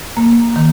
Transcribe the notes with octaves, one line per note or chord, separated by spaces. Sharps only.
A#3
D#3